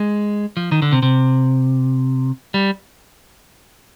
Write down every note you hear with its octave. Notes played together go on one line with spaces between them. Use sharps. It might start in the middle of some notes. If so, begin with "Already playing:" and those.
Already playing: G#3
F3
D#3
D3
C3
C3
G3